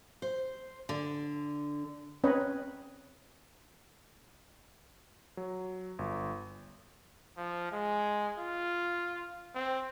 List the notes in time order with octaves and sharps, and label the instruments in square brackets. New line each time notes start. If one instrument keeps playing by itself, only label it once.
[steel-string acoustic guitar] C5
D3
[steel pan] C4 C#4 B4 C#5 D#5
[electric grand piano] F#3
G1
[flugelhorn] F3
G#3
F4
C4